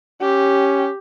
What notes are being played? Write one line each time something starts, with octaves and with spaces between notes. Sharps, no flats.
C#4 G4